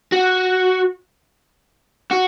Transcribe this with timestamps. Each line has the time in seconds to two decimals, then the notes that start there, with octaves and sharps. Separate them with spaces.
0.12 F#4
2.11 F#4